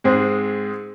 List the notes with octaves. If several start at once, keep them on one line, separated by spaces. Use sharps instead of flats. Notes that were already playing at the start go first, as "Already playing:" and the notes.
G#2 G#3 C4 G#4